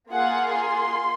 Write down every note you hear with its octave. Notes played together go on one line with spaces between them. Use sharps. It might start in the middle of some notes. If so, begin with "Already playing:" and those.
A#3 F4 G#4 F#5
C6